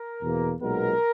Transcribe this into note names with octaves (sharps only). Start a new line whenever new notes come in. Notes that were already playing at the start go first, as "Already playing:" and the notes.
Already playing: A#4
E2 B2 A#3
B1 A#2 G#3 B3 A#4